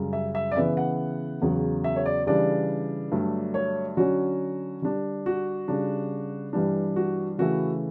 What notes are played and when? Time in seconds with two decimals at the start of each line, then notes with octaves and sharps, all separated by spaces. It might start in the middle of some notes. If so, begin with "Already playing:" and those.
Already playing: F#2 C#3 G3
0.13 E5
0.35 E5
0.51 D5
0.56 C#3 E3 B3 E4 E5
0.77 F#5
1.42 E2 C#3 F#3
1.84 E5
1.96 C#5
2.06 D5
2.27 C#3 E3 G3 D4 D5
3.12 G2 D3 F#3 A3 D4
3.54 C#5
3.97 D3 F#3 C#4 F#4
4.82 D3 G3 D4
5.26 F#4
5.68 C#3 G3 D4
6.53 G2 E3 G3 D4
6.96 F#4
7.38 C#3 E3 A3 E4 F#4